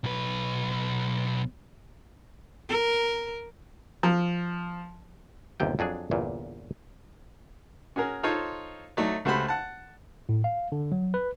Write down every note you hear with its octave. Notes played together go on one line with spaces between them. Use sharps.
B1 B4
A#4
F3
G1 D#2 C3 G5
F2 F#3 D4 G#4
G1 E2 A#2
C#4 F#4 G#4 A#4
D#4 F4 A4 C5 C#5
F#3 A3 D#4 E4 A4 D5
C#2 A3 F#4 G4 C5 B5
F#5 A5
A2
F5
D3
F#3
B4